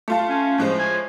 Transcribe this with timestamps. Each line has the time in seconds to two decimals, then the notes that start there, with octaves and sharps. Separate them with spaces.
0.08 A3 F4 A5
0.29 C#4
0.58 A2 F3 G#3
0.79 G#5